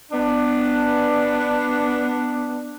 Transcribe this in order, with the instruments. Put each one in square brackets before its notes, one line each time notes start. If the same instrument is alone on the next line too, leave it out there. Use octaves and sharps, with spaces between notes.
[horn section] B3 D4